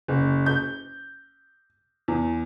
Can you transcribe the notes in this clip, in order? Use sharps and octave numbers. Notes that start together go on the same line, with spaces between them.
F#1
G6
E2